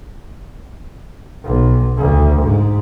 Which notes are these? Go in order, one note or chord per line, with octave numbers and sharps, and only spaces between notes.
B1
D2
G#2